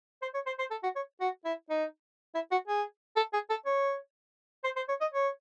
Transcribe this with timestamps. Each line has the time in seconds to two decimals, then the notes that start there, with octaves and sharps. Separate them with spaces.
0.22 C5
0.34 C#5
0.47 C5
0.59 C5
0.71 A4
0.83 F#4
0.96 C#5
1.21 F#4
1.45 E4
1.70 D#4
2.35 E4
2.52 F#4
2.68 G#4
3.17 A4
3.33 G#4
3.50 A4
3.66 C#5
4.64 C5
4.76 C5
4.89 C#5
5.01 D#5
5.14 C#5